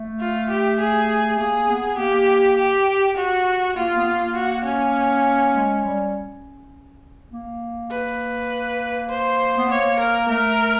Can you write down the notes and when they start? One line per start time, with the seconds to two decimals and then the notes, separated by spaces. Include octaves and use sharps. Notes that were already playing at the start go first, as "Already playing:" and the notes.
Already playing: A3
0.20 F4
0.50 G4
0.80 G#4
1.39 A#3 G#4
1.69 B3
1.98 A#3 G4
2.57 G4
3.17 F#4
3.76 A#3 F4
3.96 B3
4.06 A#3
4.36 F#4
4.65 C#4
5.55 G#3
5.85 G3
7.32 A#3
7.92 B4
9.10 C5
9.57 B3
9.69 A#3 C#5
9.99 A#4
10.28 A3 A#4